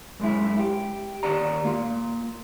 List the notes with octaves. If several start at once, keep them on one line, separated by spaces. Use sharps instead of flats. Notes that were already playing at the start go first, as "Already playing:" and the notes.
F#2 G#3 E4
G4
D#2 G4 D5 A#5
A#3 F4